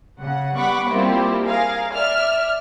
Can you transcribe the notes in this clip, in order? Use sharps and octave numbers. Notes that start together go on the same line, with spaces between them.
C#3 F#5
G3 B3 F#5 B5 C#6 D6
G3 A#3 C4 E4 F4 G4
G#4 A#4 F5
D5 E5 F6